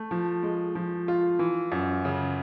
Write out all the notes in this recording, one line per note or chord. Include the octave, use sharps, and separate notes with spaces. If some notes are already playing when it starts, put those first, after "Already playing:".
Already playing: A3
F3
G#3
F3
F4
E3
F#2
C#3